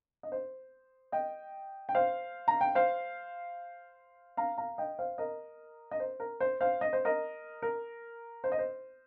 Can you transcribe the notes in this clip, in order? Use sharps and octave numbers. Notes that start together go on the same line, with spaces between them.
D#5
C5
D#5 G5
G5
C5 F5
A#5
G5
C5 F5
F5 A#5
F5 A#5
D#5 G5
C5 F5
A#4 D#5
D#5
C5
A#4
C5
C5 F5
D#5
C5
A#4 D#5
A#4
C5
D#5
C5